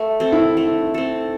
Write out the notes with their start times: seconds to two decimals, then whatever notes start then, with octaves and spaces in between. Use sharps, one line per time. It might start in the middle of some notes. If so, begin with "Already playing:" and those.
Already playing: A3
0.20 C4 A4
0.32 E4
0.57 A3
0.94 C4 A4